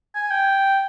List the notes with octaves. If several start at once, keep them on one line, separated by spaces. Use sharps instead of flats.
G#5
G5